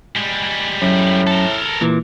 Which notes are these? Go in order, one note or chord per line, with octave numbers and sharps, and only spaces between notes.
G3 G#3
F#2 A2
A4 A#4
A#2 E3